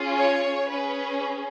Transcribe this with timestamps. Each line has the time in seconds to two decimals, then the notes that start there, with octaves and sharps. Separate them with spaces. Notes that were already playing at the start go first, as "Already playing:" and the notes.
Already playing: C#4 F4 G#4
0.19 C#5
0.70 C#4 G#4 B4